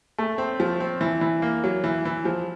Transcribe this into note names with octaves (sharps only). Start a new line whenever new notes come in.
A3
C4
F3
C4
E3
E3
A#3
F#3
E3
E3
F3